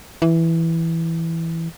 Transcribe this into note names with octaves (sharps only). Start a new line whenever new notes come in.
E3